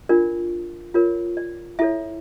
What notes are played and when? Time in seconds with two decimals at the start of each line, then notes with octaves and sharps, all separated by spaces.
0.09 D4 F4 A#4 D5
0.94 F4 A#4 C#5
1.37 D5
1.79 E4 A4 C#5 E5